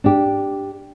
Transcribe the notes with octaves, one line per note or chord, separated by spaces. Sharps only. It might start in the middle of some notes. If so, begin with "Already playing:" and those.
D4 G4